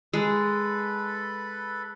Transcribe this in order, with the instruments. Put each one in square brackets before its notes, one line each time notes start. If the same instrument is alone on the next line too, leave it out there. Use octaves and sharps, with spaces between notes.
[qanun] G#3 [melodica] A4 B4 B5